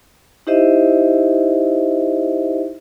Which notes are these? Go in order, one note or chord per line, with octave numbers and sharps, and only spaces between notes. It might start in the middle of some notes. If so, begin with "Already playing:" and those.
D#4 E4 G4 C5 D#5 E5